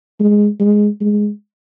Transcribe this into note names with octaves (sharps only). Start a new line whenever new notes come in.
G#3
G#3
G#3